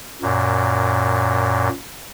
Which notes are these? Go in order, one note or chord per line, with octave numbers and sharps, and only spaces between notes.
F#2 A#2